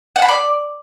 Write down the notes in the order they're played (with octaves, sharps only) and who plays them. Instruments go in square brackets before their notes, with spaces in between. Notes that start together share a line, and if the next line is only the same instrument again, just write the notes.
[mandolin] F#5
B5
D5